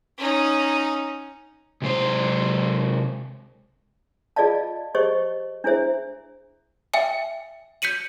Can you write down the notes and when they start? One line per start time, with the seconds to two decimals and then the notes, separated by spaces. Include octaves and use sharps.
0.18 C#4 D#4
1.82 C3 G#3 C5
4.36 F4 G#4 D5 D#5 F5 A5
4.95 G4 G#4 C5 D#5 C#6
5.64 D4 E4 G#4 C5 E5
6.93 E5 G5 G#5 C#7
7.82 G6 B6 C#7 D#7 F#7